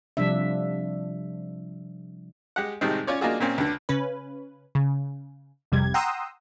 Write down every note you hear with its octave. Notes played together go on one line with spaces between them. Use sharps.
C3 F3 G3 D4 E5
G#3 G4 F#5
A2 C3 D#3 G3 G#3 C4
C#4 F4 C#5 D5
A#3 D4 D#4 F4 F#4 G#4
A#2 A#3 C4 C#4
C#2 D3
C#3 C#4 B4
C#3
G#1 F2 C3 G3 G#6
F#5 G5 A#5 C6 D#6 E6